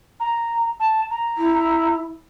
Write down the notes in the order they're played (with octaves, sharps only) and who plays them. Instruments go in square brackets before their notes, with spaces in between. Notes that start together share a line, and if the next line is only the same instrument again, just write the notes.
[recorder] A#5
A5
A#5
[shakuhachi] E4